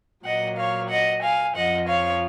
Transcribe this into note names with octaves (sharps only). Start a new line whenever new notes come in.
A#2 F#3 D#5 F#5
C#5 F5
D#5 F#5
F5 G#5
F2 F3 D#5 F#5
C#5 F5